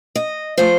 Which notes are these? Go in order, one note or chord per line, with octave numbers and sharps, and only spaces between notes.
D#5
F3 A3 C5